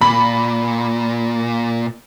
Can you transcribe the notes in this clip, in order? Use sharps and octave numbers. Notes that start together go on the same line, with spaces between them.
A#2 B5